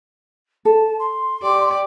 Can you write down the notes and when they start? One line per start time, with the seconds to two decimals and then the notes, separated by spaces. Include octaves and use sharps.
0.65 A4 A5
0.99 C6
1.42 G4 D5